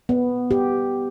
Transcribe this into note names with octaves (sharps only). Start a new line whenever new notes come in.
B3
G4